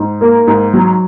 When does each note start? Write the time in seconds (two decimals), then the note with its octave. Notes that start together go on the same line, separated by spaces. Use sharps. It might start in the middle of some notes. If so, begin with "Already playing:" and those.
Already playing: G#2
0.21 A#3
0.47 G#2
0.74 F#3